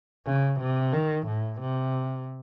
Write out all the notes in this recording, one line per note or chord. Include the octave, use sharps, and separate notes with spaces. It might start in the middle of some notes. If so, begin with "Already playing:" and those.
C#3
C3
D#3
A2
C3